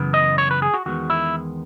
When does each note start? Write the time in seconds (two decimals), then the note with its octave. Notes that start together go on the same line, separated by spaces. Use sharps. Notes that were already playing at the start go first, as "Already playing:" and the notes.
Already playing: F#2 C#3 E3 B3
0.14 D#5
0.38 C#5
0.51 B4
0.62 G#4
0.74 F#4
0.86 E2 D#3 G#3 B3 F#4
1.10 E4